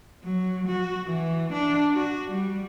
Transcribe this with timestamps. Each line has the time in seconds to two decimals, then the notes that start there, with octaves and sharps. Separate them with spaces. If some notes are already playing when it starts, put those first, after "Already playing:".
0.24 F#3
0.68 F#4
1.07 E3
1.53 D4
1.93 F#4
2.31 G3